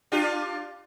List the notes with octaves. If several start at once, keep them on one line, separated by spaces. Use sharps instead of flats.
D4 F4 G4